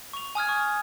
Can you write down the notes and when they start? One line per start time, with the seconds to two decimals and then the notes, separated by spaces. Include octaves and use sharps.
0.13 C#6 F7
0.35 G#5 D#6 F6 G#6
0.49 C#6